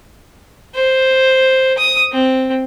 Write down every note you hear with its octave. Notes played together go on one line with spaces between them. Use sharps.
C5
D#6
C4